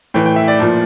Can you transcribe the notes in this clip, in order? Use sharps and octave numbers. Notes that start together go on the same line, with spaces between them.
A2 E3 G5
G5
E5
D5
A#2 F3